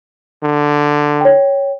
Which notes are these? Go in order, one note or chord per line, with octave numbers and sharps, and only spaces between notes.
D3
C#5 G5